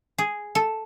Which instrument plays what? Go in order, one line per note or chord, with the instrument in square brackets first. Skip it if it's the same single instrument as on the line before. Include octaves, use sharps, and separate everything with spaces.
[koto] G#4
A4